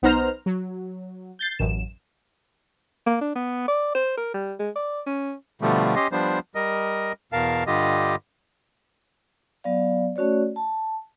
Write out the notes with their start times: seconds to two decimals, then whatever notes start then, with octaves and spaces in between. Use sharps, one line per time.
0.02 B1 B3 D#4 C5 A#5 F6
0.46 F#3
1.39 G6 A6 C7
1.59 A1 F#2 E7
3.06 A#3
3.21 D4
3.36 B3
3.68 D5
3.95 C5
4.17 A#4
4.34 G3
4.59 G#3
4.76 D5
5.07 C#4
5.62 B2 D3 F3 G3 A3
5.96 C#4 G4 D#5 C6
6.12 F3 G3 B3 D4 C5
6.55 G3 A#4 D#5
7.32 E2 B2 A#4 F5 A5
7.67 G2 D3 G3 F4 G4 D#5
9.64 F#3 B3 D5 F5
10.16 A3 C#4 F#4 C#5 D5
10.56 A5